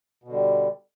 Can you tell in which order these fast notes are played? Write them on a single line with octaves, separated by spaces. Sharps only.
B2 D3 G3